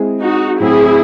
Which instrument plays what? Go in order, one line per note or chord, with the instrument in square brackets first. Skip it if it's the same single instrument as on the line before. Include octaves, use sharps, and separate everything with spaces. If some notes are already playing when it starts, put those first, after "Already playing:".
Already playing: [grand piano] G#3 C4 E4 G#4
[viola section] D#4 F#4
[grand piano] A2 F#3 C4 F#4 [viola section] E4 G#4